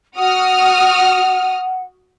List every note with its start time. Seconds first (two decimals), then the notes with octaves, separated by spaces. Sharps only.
0.16 F#4 F#5 D#6 F6